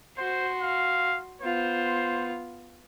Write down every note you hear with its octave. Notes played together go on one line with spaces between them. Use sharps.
F#4 C5 C6
F5
B3 F4 C5